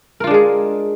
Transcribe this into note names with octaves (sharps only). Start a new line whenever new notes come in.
G#3 D4 F4 G#4 A#4